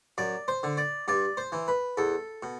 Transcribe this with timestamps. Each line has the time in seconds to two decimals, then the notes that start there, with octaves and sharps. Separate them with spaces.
0.18 F#2 D5
0.48 C5
0.63 D3
0.77 D5
1.08 G2 D5
1.37 C5
1.52 E3
1.68 B4
1.97 E2 A4
2.43 B2